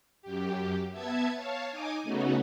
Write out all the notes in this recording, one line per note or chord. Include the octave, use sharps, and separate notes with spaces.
F#2 G4
B3 E5 A5 G#6
C#5 F5 A5
D#4 G#5 D6 D#6
C#3 A3 B3 C#4 D#4 F#4